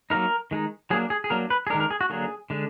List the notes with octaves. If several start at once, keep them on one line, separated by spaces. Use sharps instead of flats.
F#3 A#3 D#4 A#4
D#3 G#3 D#4
F#3 A#3 D4 G#4
G#4
G#4
F#3 A#3 D4 A#4
B4
G#4
D#3 G#3 D4 A#4
A#4
G#4
F#4
D3 F#3 A#3 D4 G#4
D3 G#3 D4